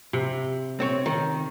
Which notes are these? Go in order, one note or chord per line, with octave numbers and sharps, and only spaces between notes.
C3
C4 C#5
D#3